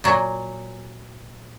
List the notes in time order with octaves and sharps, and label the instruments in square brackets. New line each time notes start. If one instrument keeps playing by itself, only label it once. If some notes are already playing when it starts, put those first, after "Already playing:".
[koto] A#2 F#3